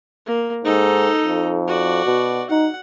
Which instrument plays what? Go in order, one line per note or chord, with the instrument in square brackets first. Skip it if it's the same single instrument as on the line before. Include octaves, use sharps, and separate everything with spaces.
[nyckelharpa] A#3
[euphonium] G#2 [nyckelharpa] D#4 A4
[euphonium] F2
[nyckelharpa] F#4 D5
[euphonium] B2
[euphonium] D#4 [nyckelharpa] F#5